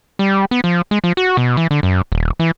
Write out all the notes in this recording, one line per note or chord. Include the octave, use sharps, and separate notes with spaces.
G3
B3
F3
G#3
F3
F#4
B2
E3
D3
F#2
D#1
E3